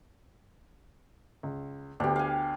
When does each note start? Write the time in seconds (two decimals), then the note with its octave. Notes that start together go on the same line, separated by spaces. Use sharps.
1.43 C#2
2.00 D2 B3 D4 G4
2.16 F5 G5 G#5